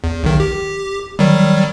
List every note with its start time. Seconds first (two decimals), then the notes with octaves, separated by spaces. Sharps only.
0.04 E2
0.23 B1 D#3
0.40 G4
1.19 D#3 F#3 G3